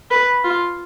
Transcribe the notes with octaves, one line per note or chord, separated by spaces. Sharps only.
B4
F4